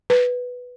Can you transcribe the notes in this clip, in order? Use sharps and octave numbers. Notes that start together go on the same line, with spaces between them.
B4